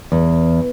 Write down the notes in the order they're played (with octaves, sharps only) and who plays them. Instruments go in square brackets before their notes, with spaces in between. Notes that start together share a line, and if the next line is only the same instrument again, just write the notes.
[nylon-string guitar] E2